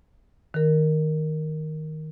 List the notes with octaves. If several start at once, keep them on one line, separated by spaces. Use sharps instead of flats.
D#3 A#4